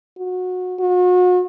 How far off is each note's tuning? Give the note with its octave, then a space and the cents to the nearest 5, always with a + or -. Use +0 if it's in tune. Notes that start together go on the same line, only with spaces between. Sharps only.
F#4 -20
F#4 -40